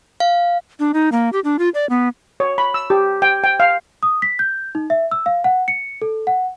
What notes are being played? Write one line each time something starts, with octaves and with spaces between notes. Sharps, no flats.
F5
D4
D#4
A#3
G4
D4
F4
D5
B3
C#5
B5
E6
G4
G5
G5
F5
D#6
B6
G6
D#4
E5
E6
F5
F#5
C#7
A4
F#5